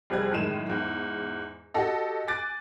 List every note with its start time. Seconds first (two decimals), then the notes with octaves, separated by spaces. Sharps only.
0.10 F1 G3 G#4 C5 F#6 G#6
0.32 F#2 A2 D#3 G#3 D#7 E7
0.68 E2 G#2
1.74 F#4 G4 A4 D#5
2.28 G#5 D6 F#6 A6 D7